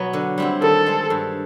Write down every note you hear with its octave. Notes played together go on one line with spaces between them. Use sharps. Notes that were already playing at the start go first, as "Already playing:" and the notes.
Already playing: B2 F#3 B3
D3
G3 C4 E4
D#3 A4
G#3 C4
G2